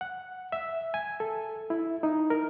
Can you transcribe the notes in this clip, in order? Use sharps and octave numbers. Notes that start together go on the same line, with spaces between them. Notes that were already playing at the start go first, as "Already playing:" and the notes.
F#5
E5
G#5
A4
E4
D#4
A#4